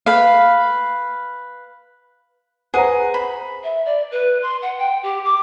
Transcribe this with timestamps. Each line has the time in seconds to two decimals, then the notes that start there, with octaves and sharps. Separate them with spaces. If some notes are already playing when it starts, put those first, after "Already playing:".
0.06 B4 F5
2.74 G#4 B4 C5 F#5 A#5
3.14 B5
3.63 E5
3.85 D5
4.11 B4
4.42 C6
4.62 F#5
4.78 G5
5.03 G4
5.25 D6